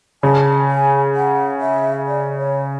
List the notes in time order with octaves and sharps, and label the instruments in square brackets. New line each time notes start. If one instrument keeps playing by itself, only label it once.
[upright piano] C#3 [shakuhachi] A5
[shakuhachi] G#5
F#5
E5
D5
C#5